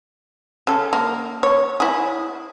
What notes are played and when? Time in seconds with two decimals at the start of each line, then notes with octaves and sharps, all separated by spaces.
0.67 C#3 A4
0.93 A#3
1.43 C#5
1.80 E4 G#4